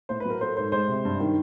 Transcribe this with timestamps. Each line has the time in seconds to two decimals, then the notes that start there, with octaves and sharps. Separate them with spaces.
0.09 A2 C5
0.20 B4
0.25 F#3 A#4
0.41 A3 C5
0.57 G#2 C5
0.72 G#3 C5
0.88 C3
1.05 G2
1.20 D#3